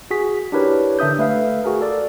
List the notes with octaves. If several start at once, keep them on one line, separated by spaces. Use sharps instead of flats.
F#4 G#4 B6
D4 E4 G4 A#4 B4 C#5
D3 D4 E5 D#6 G6
A3 B4 E5 F5
F#4 G#4 A#4
A4 D5